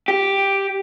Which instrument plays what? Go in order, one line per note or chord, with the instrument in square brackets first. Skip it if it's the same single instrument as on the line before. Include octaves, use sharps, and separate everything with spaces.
[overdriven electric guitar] G4